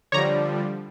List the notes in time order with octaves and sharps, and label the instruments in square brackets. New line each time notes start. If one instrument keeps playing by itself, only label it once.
[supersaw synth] D3 F3 G3 [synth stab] C#5 A#5 [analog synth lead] D5